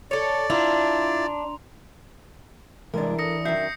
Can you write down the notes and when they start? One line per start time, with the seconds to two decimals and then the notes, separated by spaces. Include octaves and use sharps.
0.11 A4 C#5 D5
0.50 D4 E4 F4 A#5 C6 F7
2.94 C2 E3 G#3 D4 A#4 D5
3.19 A4 D#6 A#6 C#7
3.45 F#2 D#3 E5 G6 C7